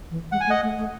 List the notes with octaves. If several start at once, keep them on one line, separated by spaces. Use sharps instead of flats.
E3
G#3 F#5
G#5
A3
D#5 F#5
A3
A3